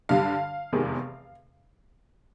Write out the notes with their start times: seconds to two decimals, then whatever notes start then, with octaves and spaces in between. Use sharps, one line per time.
0.09 G2 D3 G3 F5
0.73 F1 E2 C3 D#3 G#3